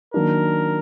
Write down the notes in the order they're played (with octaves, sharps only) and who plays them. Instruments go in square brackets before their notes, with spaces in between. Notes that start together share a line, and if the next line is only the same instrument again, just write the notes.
[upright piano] D#3 F#3 A#3 D4 [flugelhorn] A#4